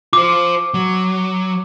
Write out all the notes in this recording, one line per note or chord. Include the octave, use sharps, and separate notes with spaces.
F4 C5 D6
F#3